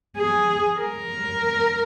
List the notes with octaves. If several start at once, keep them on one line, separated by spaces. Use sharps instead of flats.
G#4
A#4